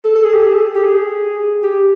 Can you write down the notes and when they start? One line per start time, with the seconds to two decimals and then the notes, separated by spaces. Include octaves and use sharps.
0.05 A4
0.15 A4
0.24 G#4
0.34 G4
0.45 G#4
0.54 A4
0.75 G4
0.84 G#4
1.63 G4